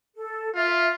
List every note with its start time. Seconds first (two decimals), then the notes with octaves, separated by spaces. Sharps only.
0.16 A4
0.55 F4 E5